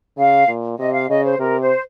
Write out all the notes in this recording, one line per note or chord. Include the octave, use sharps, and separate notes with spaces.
C#3 F5
A#2
C3 D#5
F5
C#3 D#5
C5
C3 A#4
C5